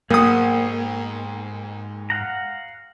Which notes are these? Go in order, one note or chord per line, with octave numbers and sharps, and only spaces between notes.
B1 G#2 A#3 G#4 C5 F#5 D#6
F5 F#5 A#5